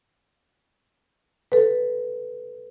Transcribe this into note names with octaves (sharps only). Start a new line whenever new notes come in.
A4 B4